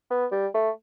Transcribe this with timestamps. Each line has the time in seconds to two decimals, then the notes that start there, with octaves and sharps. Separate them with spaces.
0.10 B3
0.32 G3
0.55 A3